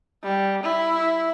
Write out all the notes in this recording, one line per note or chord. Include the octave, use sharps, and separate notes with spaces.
G3
E4